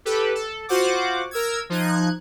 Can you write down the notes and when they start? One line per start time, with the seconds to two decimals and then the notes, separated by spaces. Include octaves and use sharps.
0.05 G4 A4 B4
0.35 A4
0.69 F4 F#4 C5 F#5 D6
1.31 A#4 E6 G#6
1.70 F3 D#4 F#6 G#6